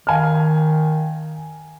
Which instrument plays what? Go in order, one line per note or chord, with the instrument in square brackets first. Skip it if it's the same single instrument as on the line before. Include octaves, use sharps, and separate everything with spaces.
[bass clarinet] D#3 [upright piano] F5 G#5 F6